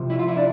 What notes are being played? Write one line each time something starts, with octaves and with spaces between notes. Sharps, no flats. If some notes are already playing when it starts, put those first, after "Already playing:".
Already playing: C2 C3 F3
E4
F4
E4
D4